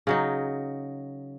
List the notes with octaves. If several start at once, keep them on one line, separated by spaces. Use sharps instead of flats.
C#3 F#3 D#4